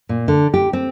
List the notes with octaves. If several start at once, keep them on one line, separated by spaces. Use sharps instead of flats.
A#2
D3
G4
C4